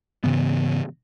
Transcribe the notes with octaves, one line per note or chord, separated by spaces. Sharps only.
G#2 C#3 E3 B3